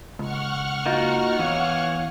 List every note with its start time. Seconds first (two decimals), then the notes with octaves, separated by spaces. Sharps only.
0.19 C#2 F#5 C#6 F6
0.86 A#3 D#4 F4 F#4
1.39 E2 E3 C#5 F5